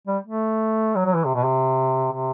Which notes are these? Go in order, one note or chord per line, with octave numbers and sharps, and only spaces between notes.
G3
A3
F#3
F#3
E3
C3
B2
C3
C3